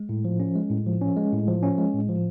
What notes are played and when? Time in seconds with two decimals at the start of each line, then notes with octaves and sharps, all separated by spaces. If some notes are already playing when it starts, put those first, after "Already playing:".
Already playing: G#3
0.09 A2
0.25 F3
0.40 C#4
0.56 G#3
0.70 A2
0.86 F3
1.01 C#4
1.17 G#3
1.33 A2
1.48 F3
1.63 C#4
1.78 G#3
1.93 A2
2.09 F3